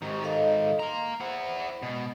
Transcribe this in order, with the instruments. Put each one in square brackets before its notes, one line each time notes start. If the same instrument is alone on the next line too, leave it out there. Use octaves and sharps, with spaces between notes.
[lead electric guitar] G#2 D#3 [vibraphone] G4 C#6
[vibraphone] A4 D#5 F5
[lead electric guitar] F5 A#5 [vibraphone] C6
[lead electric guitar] E4 F#5 [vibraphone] C5
[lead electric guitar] B2 [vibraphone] G#3